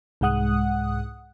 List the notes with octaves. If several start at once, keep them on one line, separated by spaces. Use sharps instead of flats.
C2 G#2 G#3 F#5 D#6 F#6